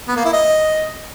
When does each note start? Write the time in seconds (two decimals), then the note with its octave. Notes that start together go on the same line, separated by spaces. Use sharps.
0.08 B3
0.16 A#3
0.25 E4
0.33 D#5